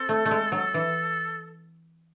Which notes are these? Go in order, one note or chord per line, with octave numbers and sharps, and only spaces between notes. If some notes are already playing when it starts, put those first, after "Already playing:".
Already playing: C4 A4
A3
A3
G#3
F#3
E3